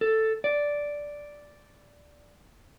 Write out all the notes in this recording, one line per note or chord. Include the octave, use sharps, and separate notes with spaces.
A4
D5